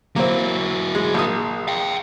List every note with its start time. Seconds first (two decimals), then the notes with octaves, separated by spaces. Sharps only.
0.16 F#3 A#3 C4 E4
0.95 G#3
1.14 A#1 D#6
1.68 F5 G5